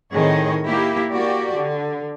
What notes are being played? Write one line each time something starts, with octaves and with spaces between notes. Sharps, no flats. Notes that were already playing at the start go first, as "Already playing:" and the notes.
A2 D#3 C4 G#4 C#5 D#5
A#3 E4 G4
A#3 F#4 G4 D5
D3